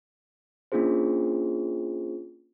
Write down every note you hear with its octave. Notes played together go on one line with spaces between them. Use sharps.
A#3 C#4 D4 F4 G#4 C5